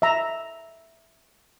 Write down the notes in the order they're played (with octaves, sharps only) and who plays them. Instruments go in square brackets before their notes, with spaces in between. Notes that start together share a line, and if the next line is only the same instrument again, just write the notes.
[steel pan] E5 A#5